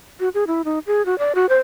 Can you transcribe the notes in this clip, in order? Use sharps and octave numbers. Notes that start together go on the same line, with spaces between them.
F#4
G#4
E4
D#4
G#4
F#4
D5
F#4
C5